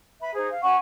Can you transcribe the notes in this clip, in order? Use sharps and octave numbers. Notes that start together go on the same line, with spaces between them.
B4 E5 B5
D#4 G#4 C5
F5
C#4 F#5 G#5 C#6